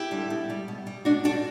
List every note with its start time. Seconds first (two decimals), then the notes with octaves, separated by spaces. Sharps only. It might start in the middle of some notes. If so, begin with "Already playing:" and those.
Already playing: E4 G4
0.11 D3 G3
0.30 B2
0.50 G3
0.68 B2
0.87 G3
1.05 B2 D4 F#4
1.24 G3 D4 F#4